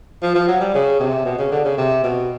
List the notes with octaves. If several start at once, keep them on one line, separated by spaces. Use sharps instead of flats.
F3
F3
F#3
G3
C#3
C3
B2
C#3
D3
C#3
C3
B2